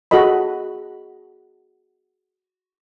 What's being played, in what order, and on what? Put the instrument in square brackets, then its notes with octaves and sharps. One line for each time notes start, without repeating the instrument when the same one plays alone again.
[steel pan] F#4 G#4 A4 D#5 B5